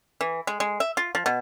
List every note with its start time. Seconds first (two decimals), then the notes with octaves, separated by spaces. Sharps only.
0.21 E3
0.47 G#3
0.60 G#3
0.80 E5
0.97 F4
1.15 F3
1.26 B2